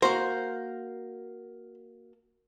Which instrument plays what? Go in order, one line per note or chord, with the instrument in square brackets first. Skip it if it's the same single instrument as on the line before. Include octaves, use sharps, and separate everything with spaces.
[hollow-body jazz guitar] A#3 F#4 A#4 [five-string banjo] C5